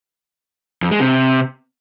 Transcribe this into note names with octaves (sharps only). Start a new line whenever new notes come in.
F2
G#3
C3